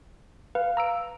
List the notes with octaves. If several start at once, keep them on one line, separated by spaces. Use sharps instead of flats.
B4 F5
A#5 E6 D7